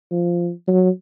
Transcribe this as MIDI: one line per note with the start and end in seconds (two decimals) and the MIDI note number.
0.12 0.50 53
0.68 0.89 54